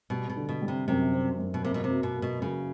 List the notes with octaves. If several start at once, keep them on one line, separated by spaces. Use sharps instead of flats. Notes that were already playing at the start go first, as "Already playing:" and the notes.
B2 G3
B2
D3
B2
G3
C3
F#2 C3
C4
F#2
B2
C3 A#3
B2
C3
F#3
B2
A#3
B2
C#3 F#3